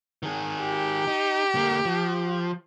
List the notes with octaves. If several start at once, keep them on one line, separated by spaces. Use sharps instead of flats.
D#3 G#4
G4
D#4
D3 A#3
F3